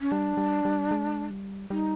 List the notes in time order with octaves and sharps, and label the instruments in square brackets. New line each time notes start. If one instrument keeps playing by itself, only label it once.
[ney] C#4
[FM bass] G3 [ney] D4
[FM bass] G3
G3
G#3
G3
[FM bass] G3 [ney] D#4